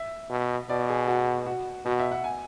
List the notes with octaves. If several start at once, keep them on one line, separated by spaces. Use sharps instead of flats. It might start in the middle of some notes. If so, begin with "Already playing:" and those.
Already playing: E5
B2
B2 D5
G#4
F#4
F#4
B2 F#4
E5
F#5
G#5